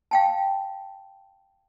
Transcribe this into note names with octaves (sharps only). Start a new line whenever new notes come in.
F5 G5 A5